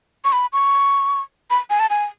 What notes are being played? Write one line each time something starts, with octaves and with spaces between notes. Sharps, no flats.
C#6
B5
C#6
B5
G#5
A5
G#5